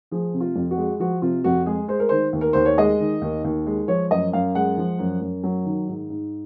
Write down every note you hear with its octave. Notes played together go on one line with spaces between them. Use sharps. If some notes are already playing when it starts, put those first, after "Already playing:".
F3 G#4
C3
F4
F2
F#4
G#3
F3 F#4
C3 F4
F2 F#4
G#3 G#4
G#3 C5
A#4
D#3 C5
D#2
A#4
D#2 C5
C#5
G#3 D#5
D#3
D#2
D#2
G#3
F3 C#5
F#2 D#5
F#2 F5
G#3 F#5
F3
F#2
F#2
F#3
D#3
G#2
G#2